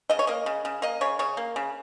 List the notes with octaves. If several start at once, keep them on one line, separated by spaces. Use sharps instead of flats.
C#3 D#5
C#5
A#3 D#5
C#3
C#3
A#3 D#5
C#3 C#5
C#3 C#5
A#3
C#3